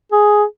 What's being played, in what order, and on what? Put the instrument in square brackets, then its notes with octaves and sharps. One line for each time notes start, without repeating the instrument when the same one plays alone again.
[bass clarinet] G#4